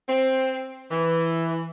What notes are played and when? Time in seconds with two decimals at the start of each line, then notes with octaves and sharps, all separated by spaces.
0.09 C4
0.91 E3